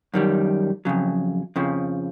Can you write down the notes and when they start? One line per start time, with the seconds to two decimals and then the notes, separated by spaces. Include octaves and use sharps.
0.14 F#2 D#3 G3
0.85 F2 C#3 F#3
1.56 F2 C#3 F3